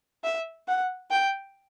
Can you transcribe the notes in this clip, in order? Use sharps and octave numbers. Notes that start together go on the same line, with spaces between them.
E5
F#5
G5